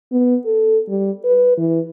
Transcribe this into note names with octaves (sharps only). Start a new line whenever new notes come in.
B3
A4
G3
B4
E3